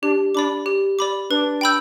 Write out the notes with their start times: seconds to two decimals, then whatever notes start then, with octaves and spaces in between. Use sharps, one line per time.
0.02 D4 G4
0.35 D4 D5 B5 D6
0.66 G4
0.99 D5 B5 D6
1.30 D4 B4
1.61 G5 B5 E6 G6